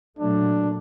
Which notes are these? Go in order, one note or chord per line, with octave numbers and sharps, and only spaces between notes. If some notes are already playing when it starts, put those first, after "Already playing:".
A#2 F#3 A3 D4